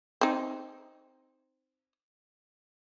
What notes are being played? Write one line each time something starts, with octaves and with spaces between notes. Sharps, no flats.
C4 D#4